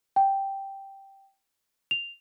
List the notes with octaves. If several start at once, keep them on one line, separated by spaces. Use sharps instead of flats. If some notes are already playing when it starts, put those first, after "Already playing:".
G5
F7